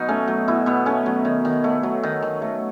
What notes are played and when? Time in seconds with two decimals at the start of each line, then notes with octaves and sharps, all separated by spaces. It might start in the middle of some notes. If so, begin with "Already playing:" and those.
Already playing: B2 F#3 D#4
0.08 A3 C#4
0.28 F#3
0.48 B2 E4
0.66 B2 B3
0.86 A3 C#4
1.06 F#3
1.25 D#3
1.45 D#3
1.64 A3
1.83 F#3
2.03 D#3
2.22 D#3
2.42 A3